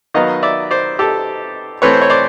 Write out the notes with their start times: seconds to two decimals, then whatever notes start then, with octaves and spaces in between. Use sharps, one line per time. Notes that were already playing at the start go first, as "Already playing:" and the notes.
0.14 D#3 F#3 B3 D#5 F5
0.43 D5 E5
0.71 C5 D5
0.99 G4 A4
1.82 E3 A3 C4 B4 C#5
1.93 C5
2.01 C#5
2.10 C5 D5